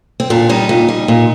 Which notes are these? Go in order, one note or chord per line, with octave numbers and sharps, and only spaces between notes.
C4
A#2 D4
G3 D#4
A#2
G3
A#2